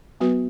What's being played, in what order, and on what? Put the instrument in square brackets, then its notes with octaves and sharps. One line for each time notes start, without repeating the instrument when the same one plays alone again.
[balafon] F#3 B3 F#4 B4